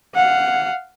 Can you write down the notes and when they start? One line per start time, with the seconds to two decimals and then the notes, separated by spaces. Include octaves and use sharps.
0.14 F5 F#5